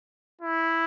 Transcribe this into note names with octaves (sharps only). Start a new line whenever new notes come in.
E4